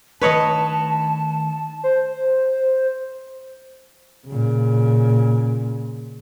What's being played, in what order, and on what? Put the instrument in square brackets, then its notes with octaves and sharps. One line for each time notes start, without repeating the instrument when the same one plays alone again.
[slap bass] D#3 A3 D4 [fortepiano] B4 C#5 D#5 [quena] A5
[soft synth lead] C5
[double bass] A#2 C#3